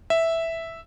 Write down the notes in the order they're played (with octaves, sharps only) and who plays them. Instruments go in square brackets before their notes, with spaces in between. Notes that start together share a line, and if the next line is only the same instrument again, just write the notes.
[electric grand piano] E5